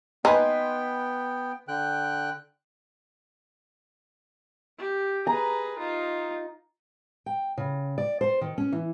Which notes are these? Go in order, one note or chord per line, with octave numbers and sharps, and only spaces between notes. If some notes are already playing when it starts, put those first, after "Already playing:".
B3 D#4 B4 G5 G#5 C6
D3 G5 F#6
G4
G#4 B4 A#5
D#4 F4
G5
C#3
D5
C5
D#3
C#4
E3